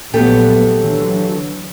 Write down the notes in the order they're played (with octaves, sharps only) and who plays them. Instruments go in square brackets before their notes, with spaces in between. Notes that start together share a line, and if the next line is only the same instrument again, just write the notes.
[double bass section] A#1 F#3 B3 [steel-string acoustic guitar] A3 G4 A4
[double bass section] D3 E3 F#3